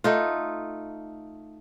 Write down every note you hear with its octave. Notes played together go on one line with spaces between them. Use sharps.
A3 D#4 F4